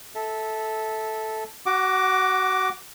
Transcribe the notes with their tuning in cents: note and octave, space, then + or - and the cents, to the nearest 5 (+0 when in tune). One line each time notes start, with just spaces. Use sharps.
A4 -5 E5 -15
F#4 +25 F#5 +0 D6 +0